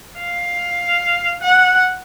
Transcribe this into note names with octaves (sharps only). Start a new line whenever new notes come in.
F5
F#5